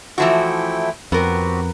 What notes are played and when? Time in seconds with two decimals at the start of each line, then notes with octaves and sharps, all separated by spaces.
0.18 E3 F3 A3 E4 F#4 G5
1.12 F2 B3 C4 F#4 G4 A#4